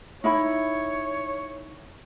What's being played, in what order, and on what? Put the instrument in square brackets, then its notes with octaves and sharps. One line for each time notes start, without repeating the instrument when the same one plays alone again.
[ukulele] D#4 E4 B5 [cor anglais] C#5